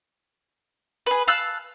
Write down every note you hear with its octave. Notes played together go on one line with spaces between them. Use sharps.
G#4 B4
F5 A5 E6 F#6